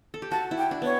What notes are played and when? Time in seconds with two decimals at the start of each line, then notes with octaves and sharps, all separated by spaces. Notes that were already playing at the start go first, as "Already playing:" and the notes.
0.14 A4
0.22 G4
0.31 F#4 A5
0.51 E4
0.58 G5
0.71 D4
0.82 B3 C#5